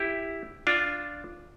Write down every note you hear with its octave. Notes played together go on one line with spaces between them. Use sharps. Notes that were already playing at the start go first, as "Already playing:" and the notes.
Already playing: E4 G4
D4 F4